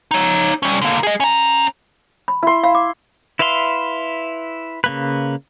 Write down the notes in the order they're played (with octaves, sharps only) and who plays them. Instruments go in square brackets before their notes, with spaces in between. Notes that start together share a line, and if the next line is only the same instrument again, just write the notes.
[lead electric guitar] D#4 C#5
G3 C#4
D3 A#3
G#4 D#5
C#4 A#5
[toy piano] B5
[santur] E4 C6
[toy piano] F5 B5
D6
[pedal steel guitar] E4 B4 E5 F5 C6
C#3 A#3 B4